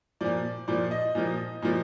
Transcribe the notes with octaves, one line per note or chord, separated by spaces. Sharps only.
A#2 F3 D5
A#2 F3 D5
D#5
A#2 F3
A#2 F3